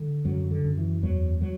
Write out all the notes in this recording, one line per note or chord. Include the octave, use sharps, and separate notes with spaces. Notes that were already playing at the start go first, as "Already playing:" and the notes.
Already playing: D3
F#2 F#3
D3
F#2
E3
E2 F#3
F#3